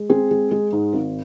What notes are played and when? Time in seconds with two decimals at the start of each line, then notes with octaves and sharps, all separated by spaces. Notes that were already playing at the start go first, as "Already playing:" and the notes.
Already playing: G#3
0.10 C4 G#4
0.31 G#3
0.51 G#3
0.73 G#2
0.94 G#1